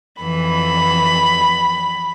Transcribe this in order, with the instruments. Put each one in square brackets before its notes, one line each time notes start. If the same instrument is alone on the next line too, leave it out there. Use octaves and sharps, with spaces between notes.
[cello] F2 E3 [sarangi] B5